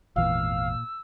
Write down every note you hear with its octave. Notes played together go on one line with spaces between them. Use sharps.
G#1 E2 A#2 E3 F5 E6